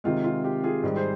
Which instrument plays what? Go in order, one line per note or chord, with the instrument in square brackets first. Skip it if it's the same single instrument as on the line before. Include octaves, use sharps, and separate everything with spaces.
[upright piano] C3 D#3 G#3 F4
F4
G4
F4 G#4
G#2 D#3 G3
G#4 C5